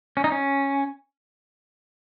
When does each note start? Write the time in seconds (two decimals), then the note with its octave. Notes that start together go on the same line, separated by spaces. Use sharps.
0.17 C#4
0.24 D#4
0.32 C#4